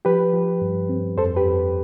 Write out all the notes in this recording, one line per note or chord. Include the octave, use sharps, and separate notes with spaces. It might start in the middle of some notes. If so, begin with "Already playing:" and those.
F3 G4 B4
F3
G2
C4
F2 A4 C5
G4 B4
F2